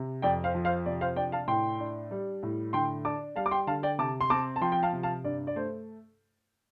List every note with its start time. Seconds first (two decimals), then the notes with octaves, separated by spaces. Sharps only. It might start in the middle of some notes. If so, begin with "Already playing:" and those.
Already playing: C3
0.22 F2 D5 G5
0.44 C5 F5
0.55 F3
0.65 C5 F5
0.86 C3 D5
1.01 C5 F5
1.16 D4 D5 G5
1.32 F5 A5
1.48 A2 G5 C6
1.80 D4
2.11 G3
2.43 A2
2.73 D3 G5 C6
3.05 D4 A5 D6
3.36 G3 F5 A5
3.46 D6
3.51 G5 C6
3.67 D3 F5 A5
3.83 D5 G5
3.98 C3 A5 D6
4.21 C6
4.30 C4 A5 D6
4.56 A5
4.61 F3 G5 C6
4.72 G5
4.83 F5 A5
4.93 C3
5.03 F5 A5
5.24 G2 D5
5.47 D5
5.56 A3 C5